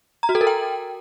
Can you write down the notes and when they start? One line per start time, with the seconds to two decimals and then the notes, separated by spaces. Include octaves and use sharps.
0.23 A#5
0.29 F#4
0.35 A4
0.41 A#4
0.47 G5